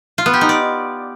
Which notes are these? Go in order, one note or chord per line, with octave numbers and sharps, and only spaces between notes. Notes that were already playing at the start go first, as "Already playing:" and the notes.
F4
B3
G4
D#4
D5